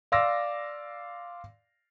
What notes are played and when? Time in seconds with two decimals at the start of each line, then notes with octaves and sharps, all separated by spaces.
0.12 D5 F5 C6 D6 E6 A#6